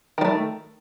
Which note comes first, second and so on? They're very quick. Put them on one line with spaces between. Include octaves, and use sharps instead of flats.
D#3 G3 A3